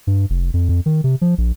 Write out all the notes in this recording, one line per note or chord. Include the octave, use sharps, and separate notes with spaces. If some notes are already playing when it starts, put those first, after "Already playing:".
G2
F1
F2
F2
D#3
C3
F3
A#1